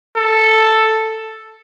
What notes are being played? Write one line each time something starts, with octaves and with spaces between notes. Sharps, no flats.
A4